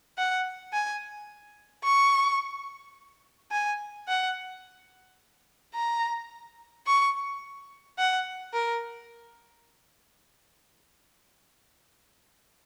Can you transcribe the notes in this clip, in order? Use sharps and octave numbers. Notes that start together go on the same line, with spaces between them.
F#5
G#5
C#6
G#5
F#5
A#5
C#6
F#5
A#4